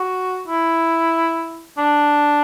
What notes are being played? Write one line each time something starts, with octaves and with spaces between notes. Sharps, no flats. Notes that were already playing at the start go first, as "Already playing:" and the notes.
Already playing: F#4
E4
D4